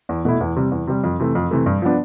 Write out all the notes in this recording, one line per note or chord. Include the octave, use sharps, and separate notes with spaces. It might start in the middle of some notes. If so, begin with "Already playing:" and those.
E2
B2 A3 E4
E2
C3 G3
E2
C3 G3
F2
C3 E3 A3
F2
C3 E3 A3
G2
F3 B3 D4